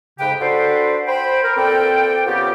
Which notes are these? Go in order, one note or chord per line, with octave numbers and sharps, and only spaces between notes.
F2 G#2 C#3 G4 B4 G5
D4 F#4 A4 B4 C5
C5 G5 B5
A#4
A#2 C4 A4 D5 G5
C#3 B3 F4 G4